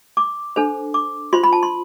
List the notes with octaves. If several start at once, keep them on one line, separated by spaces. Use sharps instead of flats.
D6
D4 A4 C5
D6
F4 C5 C6
B5
A5
C6